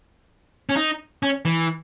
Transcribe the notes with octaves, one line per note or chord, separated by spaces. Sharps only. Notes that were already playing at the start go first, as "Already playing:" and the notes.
C#4
D#4
C#4
E3